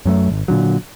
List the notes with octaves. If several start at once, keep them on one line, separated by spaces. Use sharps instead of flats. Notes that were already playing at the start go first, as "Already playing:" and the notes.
F#2 F#3 A3
G#1
A#2 D3 F#3